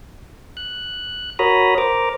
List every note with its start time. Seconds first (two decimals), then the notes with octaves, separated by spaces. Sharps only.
0.57 F#6
1.39 F#4 A#4 C#5 A#5 B5 D#6
1.78 A#4 C5 A#5 D6